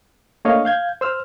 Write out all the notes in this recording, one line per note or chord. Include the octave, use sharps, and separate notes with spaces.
A3 A#3 D4 C#5 D#5 F5
F5 G6 G#6
C5 E6 F6